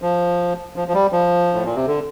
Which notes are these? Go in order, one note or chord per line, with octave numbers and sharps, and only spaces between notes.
F3
F3
F3
G3
F3
A2
A#2
C3
D3